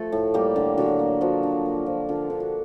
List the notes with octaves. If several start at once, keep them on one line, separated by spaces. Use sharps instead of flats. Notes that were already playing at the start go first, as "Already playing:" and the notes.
Already playing: F3 A3 A4
A2
G3 A#3 G4
D3
D3 F#3 F#4
A#3
F3 F#3 F#4
D3
A#3
F3
D3 F3 F4
D3
F#4